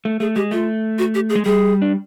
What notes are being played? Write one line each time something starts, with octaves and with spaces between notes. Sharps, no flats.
A3
A3 G#4
G#3 G4
A3 F4
F#4
G4
G#4
G#3
G3 G#4
D4